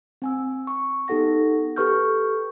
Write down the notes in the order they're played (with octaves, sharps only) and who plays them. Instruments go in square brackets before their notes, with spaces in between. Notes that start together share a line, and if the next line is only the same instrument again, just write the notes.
[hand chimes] C4 G#5 E6
C#6
B3 D#4 G4 A4 F#5 A#6
G4 A4 B4 C#6 F6 G6